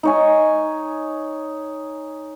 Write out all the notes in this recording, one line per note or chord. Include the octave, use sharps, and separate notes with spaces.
D#4 C#5 G#5